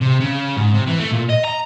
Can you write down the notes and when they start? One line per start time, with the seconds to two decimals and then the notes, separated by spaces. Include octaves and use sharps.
0.02 C3
0.20 C#3
0.57 G#2
0.74 C3
0.88 E3
1.00 A3
1.12 A#2
1.30 D#5
1.45 A#5